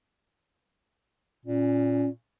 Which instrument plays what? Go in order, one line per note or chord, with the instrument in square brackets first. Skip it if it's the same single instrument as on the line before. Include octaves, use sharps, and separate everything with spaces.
[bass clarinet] A#2 [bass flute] C#4